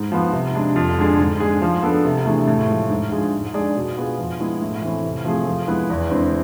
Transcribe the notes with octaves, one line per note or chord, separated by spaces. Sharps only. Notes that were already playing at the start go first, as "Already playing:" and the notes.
Already playing: G#2
F3 B3
C3
G#3 D4
F2
D3 G#3 D4 G#4
G#2
G#3 D4 G#4
F3
B3 D4 A4
C3
E3 A3 D4 G#4
A2
F3 G#3
G#2
F3 G#3 D4 G#4
G#2
G#3 D4 G#4 D5
B2
B3 F4 G#4 B4
F3
G#3 B3 E4
A2
E3 A3 C4
C3
F3 A3 C4 G#4
F3
G#3 B3 E4 B4
E2
D3 G#3 C4 E4